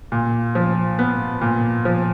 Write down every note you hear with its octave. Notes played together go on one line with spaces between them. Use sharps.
A#2
F3
B3
A#2
F3